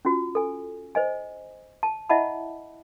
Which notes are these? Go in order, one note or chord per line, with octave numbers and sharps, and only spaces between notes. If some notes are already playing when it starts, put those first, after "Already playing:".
C#4 F4 F#4
A4 G#5
C5 D#5 G#5
A5
E4 D#5 E5 F#5 A5 B5